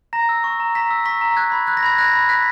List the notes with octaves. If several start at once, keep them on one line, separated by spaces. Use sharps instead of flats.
A#5 A#6
E6
C#6
A#5
A#5 B6
E6
C#6 B6
A#5
F#6 G#6
B5
F#6 G#6
A#6
B5 G#6
F#6 A#6
B5
F#6 B6